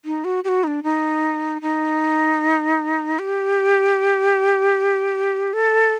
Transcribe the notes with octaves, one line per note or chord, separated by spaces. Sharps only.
D#4
F#4
G4
F#4
D#4
D4
D#4
D#4
G4
A4